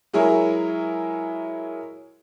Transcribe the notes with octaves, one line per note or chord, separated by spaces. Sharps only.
F#3 G#3 E4 G#4 A#4 C#5